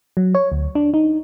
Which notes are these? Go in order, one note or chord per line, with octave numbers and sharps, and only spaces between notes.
F#3
C#5
D2
D4
D#4